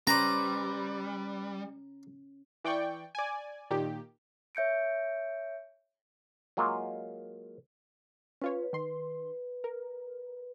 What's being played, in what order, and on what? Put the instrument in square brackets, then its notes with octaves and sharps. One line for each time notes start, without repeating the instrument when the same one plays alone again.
[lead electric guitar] G3 [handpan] C#4 [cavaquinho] B4 C5 D5 [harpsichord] A#5
[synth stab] E3 D5 G5 C#6
D5 G#5
A#2 D#3 G4
[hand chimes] C#5 E5 G6 C#7 D7
[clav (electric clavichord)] F#3 G#3 A#3 F4
[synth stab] C#4 F4 C#5 [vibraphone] B4
[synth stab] D#3 C6
A#4